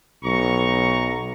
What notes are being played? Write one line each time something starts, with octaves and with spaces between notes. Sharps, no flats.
B1 A#5 C#6